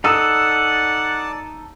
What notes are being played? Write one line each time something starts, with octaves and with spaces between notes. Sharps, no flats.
D#4 A4 D5 F#5 A5 D#6 E6